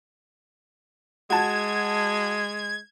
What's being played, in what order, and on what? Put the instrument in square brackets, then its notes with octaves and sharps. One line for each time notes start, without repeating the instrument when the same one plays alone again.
[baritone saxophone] G#3 [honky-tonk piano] F#4 A5 [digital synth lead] G#6